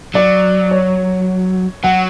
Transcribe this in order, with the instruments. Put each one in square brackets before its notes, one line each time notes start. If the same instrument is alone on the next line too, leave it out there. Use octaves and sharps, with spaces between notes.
[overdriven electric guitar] F#3 [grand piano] D5
[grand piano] C#5
[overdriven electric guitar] F#3 [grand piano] F#5